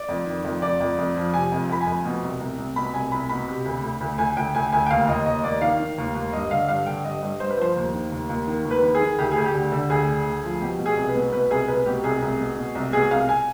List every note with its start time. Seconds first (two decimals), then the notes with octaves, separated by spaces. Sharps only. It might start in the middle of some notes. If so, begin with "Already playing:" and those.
Already playing: D5
0.09 F2
0.26 D#3
0.44 F2
0.62 F2 D5
0.80 F2
0.98 F2
1.16 F3
1.34 C3 G#5
1.52 F2
1.69 F2 B5
1.81 G#5
1.87 F2
2.05 B2
2.23 C2
2.40 C2
2.58 C2
2.76 B2 B5
2.94 C2 G#5
3.12 C2 B5
3.29 B2 B5
3.48 C3
3.65 D2
3.84 D2
4.01 D2
4.18 D2 G#5
4.37 D2 G5
4.55 D2 G#5
4.72 D2 G#5
4.86 G5
4.91 D#2 F5
5.08 D#2 D#5
5.26 D#2 D#5
5.43 D#2 D5
5.61 D#3 F5
5.80 D#3
5.98 D#2
6.15 D#2
6.33 G2 D#5
6.51 D3 F5
6.68 G2 F5
6.86 D3 G5
7.04 G2 D#5
7.22 G2
7.40 G2 C5
7.50 B4
7.58 F3 C5
7.76 D#2
7.94 D#3
8.12 D#2
8.29 D#2
8.47 D#3
8.65 D#2
8.71 B4
8.83 D#3
8.95 G#4
9.00 D#3
9.18 D2 G4
9.31 G#4
9.37 D2
9.45 G4
9.54 D3
9.72 D3
9.90 D2 G#4
10.08 D3
10.26 D2
10.43 F3
10.61 B2 G4
10.79 B2
10.86 G#4
10.97 C2
11.09 B4
11.15 B2
11.32 B2 B4
11.50 C2 G#4
11.68 C2 B4
11.86 B2 G4
12.04 C2 G#4
12.22 C2
12.40 B2
12.57 B2
12.75 C2
12.93 B2 G#4
13.11 C2 F5
13.29 G#5